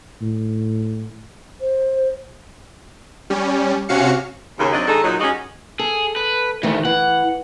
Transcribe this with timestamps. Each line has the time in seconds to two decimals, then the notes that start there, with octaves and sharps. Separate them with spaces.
0.21 A2
1.61 C5
3.30 G3 C#4
3.89 C3 C#4 F#4 F5 C#7
4.59 D#2 C#3
4.72 F#3 C4 D4 D#4 D#5
4.87 D#3 G#3 D#4 A4
5.03 A#2 F#3 D#4
5.20 G3 G#3 C#4 D#4 F#4 D#5
5.79 G#4 A4
6.16 B4
6.63 D2 D#3 E3 A3
6.85 E3 F#5